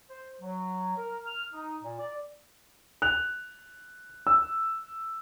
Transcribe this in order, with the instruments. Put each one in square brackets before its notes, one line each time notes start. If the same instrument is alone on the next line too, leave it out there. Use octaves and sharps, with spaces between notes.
[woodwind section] C5
F#3
A#4
F6
D#4
A#2
D5
[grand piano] F#6 F7
E6